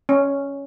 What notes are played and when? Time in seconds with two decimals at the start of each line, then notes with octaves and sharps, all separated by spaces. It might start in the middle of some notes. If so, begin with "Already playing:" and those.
0.09 C#4